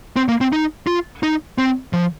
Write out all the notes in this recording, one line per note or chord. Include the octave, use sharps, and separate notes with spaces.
C4
A#3
C4
D#4
F4
D#4
C4
F3